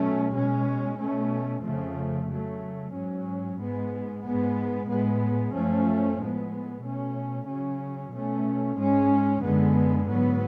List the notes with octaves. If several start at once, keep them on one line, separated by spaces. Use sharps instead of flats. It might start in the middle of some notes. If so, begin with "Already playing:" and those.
Already playing: B2 F#3 A3 C#4
B2 G#3 C#4
B2 A3 C#4
F2 C#3 F3 A3
C#3 F#3 A3
G#2 F#3 C#4
G#2 G#3 B3
G#2 G#3 B3
A2 G#3 B3
F#2 F3 A3 C#4
A2 G#3 B3
B2 A3 C#4
C#3 F#3 C#4
B2 A3 C#4
G#2 G#3 C#4
F#2 D3 G#3 B3
G#2 F#3 B3